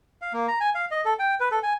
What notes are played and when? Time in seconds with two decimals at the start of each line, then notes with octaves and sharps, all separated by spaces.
0.22 F5
0.33 A#3
0.48 A#5
0.60 G#5
0.75 F5
0.91 D#5
1.05 A4
1.19 G5
1.40 B4
1.51 A4
1.63 G#5